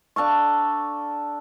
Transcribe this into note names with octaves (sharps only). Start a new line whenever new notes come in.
D4 A4 F5 C#6